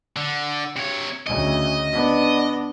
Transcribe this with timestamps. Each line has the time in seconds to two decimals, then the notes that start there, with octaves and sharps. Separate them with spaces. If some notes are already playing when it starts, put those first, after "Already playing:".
0.16 D3
0.76 C3 C#5
1.27 D2 C#3 D#5
1.93 B3 D4